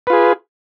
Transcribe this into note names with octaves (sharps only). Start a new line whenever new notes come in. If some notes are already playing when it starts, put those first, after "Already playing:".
F4 G#4 B4